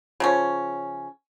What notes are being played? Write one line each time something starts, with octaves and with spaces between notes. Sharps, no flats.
C#3 F3 C#4